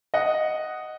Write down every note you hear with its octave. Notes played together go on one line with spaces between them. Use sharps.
D#5 F#5